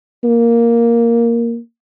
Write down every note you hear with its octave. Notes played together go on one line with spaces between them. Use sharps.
A#3